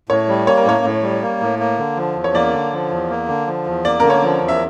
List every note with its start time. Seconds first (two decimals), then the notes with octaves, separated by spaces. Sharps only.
0.09 A2 C#5
0.28 G3
0.47 A#3 C#5
0.57 A#4
0.65 A2 C#5
0.84 A2
1.03 G3
1.22 A#3
1.41 A2
1.59 A#3
1.78 D3
1.97 F3
2.15 E2
2.24 C#5
2.34 A#3 D5
2.53 D3
2.73 F3
2.91 E2
3.10 A#3
3.28 D3
3.47 F3
3.66 E2
3.85 A#3 D5
4.00 D3 A#4
4.10 C#5
4.23 F3
4.41 E2
4.48 E5